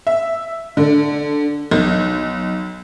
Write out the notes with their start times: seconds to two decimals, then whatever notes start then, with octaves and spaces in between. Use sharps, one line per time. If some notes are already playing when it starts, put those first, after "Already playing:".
0.07 E5
0.77 D3
1.71 B1